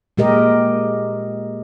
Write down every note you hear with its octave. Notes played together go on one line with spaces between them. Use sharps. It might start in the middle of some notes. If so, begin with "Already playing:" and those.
A#2 G#3 G4 A#4 D#5